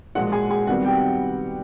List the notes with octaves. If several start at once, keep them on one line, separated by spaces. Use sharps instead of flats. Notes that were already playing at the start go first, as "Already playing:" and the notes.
A#2 F3 G#3 F#4 F#5
G#4 G#5
G#4 G#5
C3 D#3 G3 B3 F#4 F#5
G4 G5